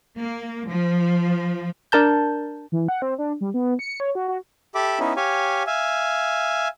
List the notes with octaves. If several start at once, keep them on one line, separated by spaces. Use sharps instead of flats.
A#3
F3
D4 A#4 A5 G6
E3
F#5
C4
D4
G3
B3
C#7
C#5
F#4
F#4
G4 A4 E5 B5 D6
B3 C#4 D#4 E4
G4 C#5 F5 G#5
E5 F5 G#5